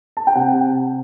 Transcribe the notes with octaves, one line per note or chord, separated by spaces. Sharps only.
A5
G5
C3 F#5